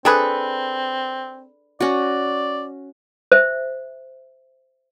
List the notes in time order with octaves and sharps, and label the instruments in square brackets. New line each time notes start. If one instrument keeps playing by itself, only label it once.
[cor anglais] C4 [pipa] D4 G#4 B4 [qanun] A4
[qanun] C#4 F#4 [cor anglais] D5
[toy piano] C5 E5